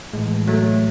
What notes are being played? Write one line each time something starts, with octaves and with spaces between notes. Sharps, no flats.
A2 E3 G#3
F#3 A3